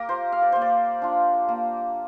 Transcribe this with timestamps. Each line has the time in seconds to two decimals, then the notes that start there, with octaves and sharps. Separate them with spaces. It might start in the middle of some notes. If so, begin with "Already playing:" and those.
Already playing: A#3 G4 A#4
0.09 F4 C5
0.32 F5
0.42 D5
0.52 A#3 C5
0.61 D5
1.02 D4 F4
1.48 A#3